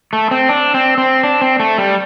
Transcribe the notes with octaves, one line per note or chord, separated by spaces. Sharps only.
A3
C4
D4
C4
C4
D4
C4
A3
G3